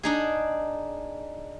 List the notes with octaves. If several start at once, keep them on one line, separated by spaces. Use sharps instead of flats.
D4 D#4 G#4